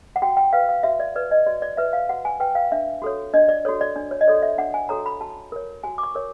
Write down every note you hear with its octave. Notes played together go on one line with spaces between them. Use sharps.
F#5
F#4 G5
G5
B4 F5
F5
F#4 E5
D5
B4 D5
D#5
F#4 D5
D5
B4 E5
F5
F#4 F#5
G#5
B4 G5
F5
D4 E5
F#4 A4 C#5
D4 D#5
D5
F#4 A4 C#5
D5
D4
C#5
D#5
F#4 A4 C#5 D5
E5
D4 F#5
G#5
F#4 A4 C#5 A#5
B5
F#4 A5
A#4 C#5
F#4 G#5
D6
C#6
A#4 C#5